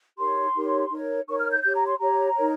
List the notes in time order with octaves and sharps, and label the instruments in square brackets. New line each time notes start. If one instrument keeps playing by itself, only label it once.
[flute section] D#4 G4 A#4 C#5 C6
D#4 G4 A#4 C#5
D#4 A#4 C#5
D#4 A#4 C#5 C#6
F6
G6
G4 C#5 G6
A#5
C6
G4 C#5 A#5
D#4 A#4 C#5